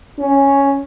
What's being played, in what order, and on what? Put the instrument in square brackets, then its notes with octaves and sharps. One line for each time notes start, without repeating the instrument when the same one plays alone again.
[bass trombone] C#4